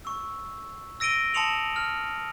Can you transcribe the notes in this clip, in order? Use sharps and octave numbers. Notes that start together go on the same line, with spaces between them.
C#6 E6
E6 A#6 D7 D#7 G7
A5 C6 D#6 C#7 F7 F#7
F6